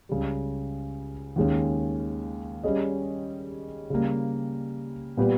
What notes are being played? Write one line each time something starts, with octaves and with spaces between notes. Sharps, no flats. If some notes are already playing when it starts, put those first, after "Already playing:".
C#2 C#3 G3
D#2 D#3 G#3 C#4
G3 C#4 G#4 D#5
C#3 G3 A#3
A#2 G3 B3 G4 B4